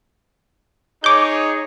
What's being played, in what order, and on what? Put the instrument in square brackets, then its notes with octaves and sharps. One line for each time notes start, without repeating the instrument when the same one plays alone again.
[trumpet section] D#4 G#4 C#5 [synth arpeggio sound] D6 G6